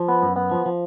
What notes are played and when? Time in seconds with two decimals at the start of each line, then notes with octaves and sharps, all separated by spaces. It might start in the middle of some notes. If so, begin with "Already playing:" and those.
Already playing: F3
0.08 B3
0.22 F#2
0.36 B3
0.51 F3
0.66 F3